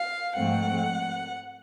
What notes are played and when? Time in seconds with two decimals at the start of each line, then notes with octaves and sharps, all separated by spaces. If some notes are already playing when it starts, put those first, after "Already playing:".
Already playing: F5
0.37 G#2 F3 A3 C4 F#5